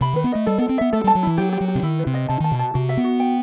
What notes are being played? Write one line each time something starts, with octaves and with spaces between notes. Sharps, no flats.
C3 B5
D#3 B4
B3
A3 D#5
G3 A4
B3 A4
C4
B3 E5
A3 A4
G3 A5
F#3
E3 E4
F#3 G4
G4
F#3
G4
C3
D#3 E4
B4
C3
D#5
C3 A5
D#3 A5
B2
A5
C3 F#4
E5
B3
F#4
G5